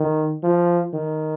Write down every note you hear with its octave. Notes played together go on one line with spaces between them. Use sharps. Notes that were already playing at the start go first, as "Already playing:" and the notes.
Already playing: D#3
F3
D#3